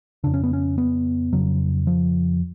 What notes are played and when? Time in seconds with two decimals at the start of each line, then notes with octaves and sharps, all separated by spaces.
0.24 F2 C#3 D4
0.34 C#4
0.44 B3
0.53 C#4
0.78 B3
1.33 F2 C#3 F#3
1.87 F3